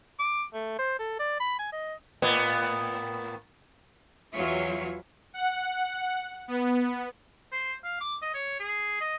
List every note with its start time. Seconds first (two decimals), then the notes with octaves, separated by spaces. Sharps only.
0.19 D6
0.54 A3
0.79 C5
0.99 A4
1.19 D5
1.40 B5
1.59 G#5
1.72 D#5
2.22 A2 A#3 B3
4.33 E2 E3 F#3 F4 C#5 E5
5.34 F#5
6.48 B3
7.53 C5
7.84 F5
8.01 D6
8.22 D#5
8.34 C#5
8.60 G#4
9.01 D#5